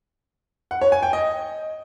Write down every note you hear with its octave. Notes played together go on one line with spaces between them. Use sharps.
F#5
C#5
G#5
G5
D#5